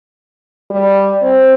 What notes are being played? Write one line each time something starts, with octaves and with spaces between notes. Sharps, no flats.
G3
C4